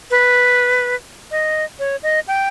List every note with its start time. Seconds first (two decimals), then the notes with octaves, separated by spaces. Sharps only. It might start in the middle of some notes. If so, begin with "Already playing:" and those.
0.11 B4
1.31 D#5
1.79 C#5
2.03 D#5
2.28 G5